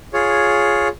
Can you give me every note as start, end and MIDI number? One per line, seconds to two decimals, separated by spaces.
0.13 0.88 65
0.13 0.88 68
0.13 0.88 73